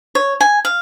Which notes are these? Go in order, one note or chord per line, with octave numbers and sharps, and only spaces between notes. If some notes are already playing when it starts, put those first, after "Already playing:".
C#5
G#5
F5